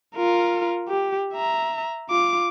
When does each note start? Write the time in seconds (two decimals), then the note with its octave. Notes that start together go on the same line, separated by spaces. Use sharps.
0.16 F4 A#4
0.88 G4
1.34 E5 A#5
2.10 F4 D6